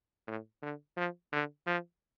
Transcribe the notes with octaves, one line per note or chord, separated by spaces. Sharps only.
A2
D3
F3
D3
F3